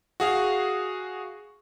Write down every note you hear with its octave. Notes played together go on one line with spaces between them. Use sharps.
F#4 G#4 F5